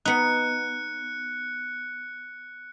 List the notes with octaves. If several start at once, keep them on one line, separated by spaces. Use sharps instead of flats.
B3 D#4 F#6 C#7